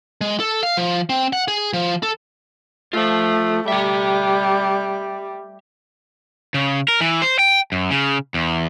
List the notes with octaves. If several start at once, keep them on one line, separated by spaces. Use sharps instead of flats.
G#3
A4
F5
F3
C4
F#5
G#4
F3
A4
A3 F4 C5
G3 G4 E5
C#3
A#4
E3
C5
G5
F#2
C#3
E2